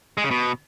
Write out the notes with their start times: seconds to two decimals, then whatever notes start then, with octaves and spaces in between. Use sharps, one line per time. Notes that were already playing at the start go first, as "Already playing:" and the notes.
0.18 G#3
0.24 C#3
0.31 B2